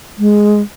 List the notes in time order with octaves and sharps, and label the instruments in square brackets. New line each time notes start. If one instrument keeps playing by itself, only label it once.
[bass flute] G#3